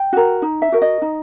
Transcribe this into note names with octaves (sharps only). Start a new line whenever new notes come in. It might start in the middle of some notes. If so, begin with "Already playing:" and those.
Already playing: G5
F#4 A#4
D#4
E5
F#4 A#4
D#5
D#4